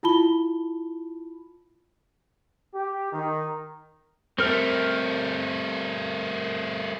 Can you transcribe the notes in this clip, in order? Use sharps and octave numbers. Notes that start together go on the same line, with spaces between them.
E4 F4 A5 B5 G7
G4
D#3
G3 A3 C4 A#4 F6